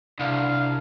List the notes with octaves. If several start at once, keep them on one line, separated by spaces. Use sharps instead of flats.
C2 D4 F5